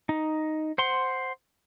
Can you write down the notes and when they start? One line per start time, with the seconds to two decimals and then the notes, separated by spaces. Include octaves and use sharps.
0.09 D#4
0.78 C5 F#5 C6